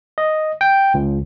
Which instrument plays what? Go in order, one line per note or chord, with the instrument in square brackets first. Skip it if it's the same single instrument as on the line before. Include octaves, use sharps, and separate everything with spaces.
[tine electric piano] D#5
G5
C#2